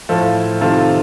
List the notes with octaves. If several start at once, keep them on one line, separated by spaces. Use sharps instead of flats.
A2 F3 F4 A4
C3 D#3 F4 A4